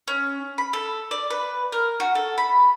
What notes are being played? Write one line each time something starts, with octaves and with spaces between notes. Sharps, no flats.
C#4
B5
A4
D5
B4
A#4
F#4
A4
B5